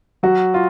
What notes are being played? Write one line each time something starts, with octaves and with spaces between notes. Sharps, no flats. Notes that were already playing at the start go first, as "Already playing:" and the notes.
F#3 F#4
F4